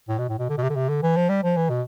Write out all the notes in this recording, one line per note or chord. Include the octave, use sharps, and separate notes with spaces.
A2
B2
A2
B2
D3
B2
C3
D3
C3
D3
E3
F3
G3
F3
E3
B2